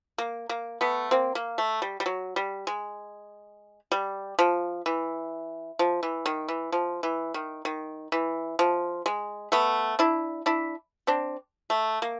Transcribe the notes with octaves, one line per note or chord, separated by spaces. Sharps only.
A#3
A#3
A3 B3
A#3 C4
A#3
A3
G3
G3
F#3
G3
G#3
G3
F3
E3
F3
E3
D#3
E3
F3
E3
D#3
D#3
E3
F3
G#3
A3 B3
D4 E4
D4 E4
C4 D4
A3
A#3